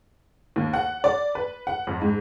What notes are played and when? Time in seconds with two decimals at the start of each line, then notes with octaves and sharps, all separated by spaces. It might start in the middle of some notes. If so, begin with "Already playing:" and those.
0.56 D#2
0.74 F#5
1.04 D5
1.35 B4
1.67 F#5
1.87 F2
2.01 G#2